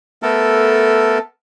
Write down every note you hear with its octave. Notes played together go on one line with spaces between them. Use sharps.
A3 B3 A4 A#4